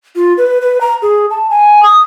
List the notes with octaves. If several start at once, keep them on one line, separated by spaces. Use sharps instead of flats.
F4
B4
B4
A#5
G#4
A5
G#5
D#6